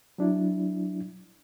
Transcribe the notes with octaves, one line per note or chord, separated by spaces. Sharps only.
F#3 D4 E4